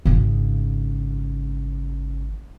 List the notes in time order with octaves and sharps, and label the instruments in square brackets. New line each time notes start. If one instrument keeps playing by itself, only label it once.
[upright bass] G#1 C#3